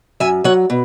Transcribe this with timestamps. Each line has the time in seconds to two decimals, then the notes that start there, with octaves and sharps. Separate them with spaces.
0.20 F#2 E5 G#5
0.44 F#3 C#5 F#5
0.70 B2